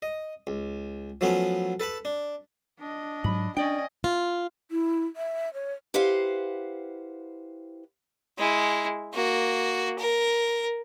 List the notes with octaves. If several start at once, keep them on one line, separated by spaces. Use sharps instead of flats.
D#5
C#2
F3 F#3 A3 B3 C#4
A4 B4 A5 B5
D4
D4 D#5
G#2 F#3 B5
C#4 D4 D5 D#5 G5 G#5
F4
E4
E5
C#5
E4 G4 B4 C5 F5 F#5
G#3 E4
A#3 F#4
A#4